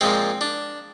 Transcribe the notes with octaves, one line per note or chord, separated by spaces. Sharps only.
A#2 F3 G#3 C4
D4